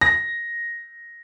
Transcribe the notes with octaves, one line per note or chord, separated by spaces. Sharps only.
A#6